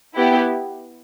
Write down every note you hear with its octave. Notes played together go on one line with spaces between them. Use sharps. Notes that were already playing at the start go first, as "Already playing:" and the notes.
B3 E4 G4